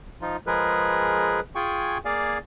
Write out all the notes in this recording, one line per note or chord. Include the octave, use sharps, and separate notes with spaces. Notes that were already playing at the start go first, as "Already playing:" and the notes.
F3 D#4 F4
F3 G#3 G#4 A#4 B4
F4 G#4 G5 G#5 C#6
A#3 G#4 D5 F5 G#5